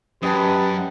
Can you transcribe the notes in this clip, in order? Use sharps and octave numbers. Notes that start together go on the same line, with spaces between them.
F#2 G4 B4 D#5 G5 A5